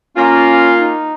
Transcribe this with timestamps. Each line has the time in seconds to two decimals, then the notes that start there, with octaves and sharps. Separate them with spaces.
0.17 A#3 C#4 F4
0.77 D#4